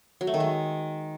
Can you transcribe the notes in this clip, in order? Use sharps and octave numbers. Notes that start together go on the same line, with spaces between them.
F#3
A3
D#3
G#3